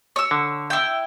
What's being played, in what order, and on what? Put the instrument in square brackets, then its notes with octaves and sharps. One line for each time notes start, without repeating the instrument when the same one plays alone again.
[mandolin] C#5 E6
[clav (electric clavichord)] D3
[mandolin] E4 G5